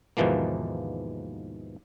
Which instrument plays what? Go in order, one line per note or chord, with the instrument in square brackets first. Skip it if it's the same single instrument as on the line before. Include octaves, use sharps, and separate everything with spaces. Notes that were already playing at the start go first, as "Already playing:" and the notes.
[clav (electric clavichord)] D#2 G#2 B2 E3 F3 A#3